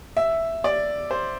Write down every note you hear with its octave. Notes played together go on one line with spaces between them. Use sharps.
E5
D5
C5